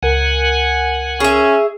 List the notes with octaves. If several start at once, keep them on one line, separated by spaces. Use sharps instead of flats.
C#2 A#4 F#5 G#5
C#4 G#4 E5